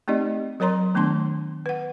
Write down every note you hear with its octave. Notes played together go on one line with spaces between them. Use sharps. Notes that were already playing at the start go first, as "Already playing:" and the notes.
A3 C4 D#4 G4 D5 D#5
F#3 A#4 C#5 A#5 C6
D#3 A3 B3 D4 A5 C6
B4 F#5